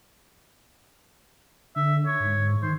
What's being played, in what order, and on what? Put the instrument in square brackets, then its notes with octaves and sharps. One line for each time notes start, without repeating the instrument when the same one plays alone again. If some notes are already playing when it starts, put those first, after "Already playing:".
[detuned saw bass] D3 [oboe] E5
[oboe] C#5
[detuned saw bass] G#2
[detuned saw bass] D#3 [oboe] C5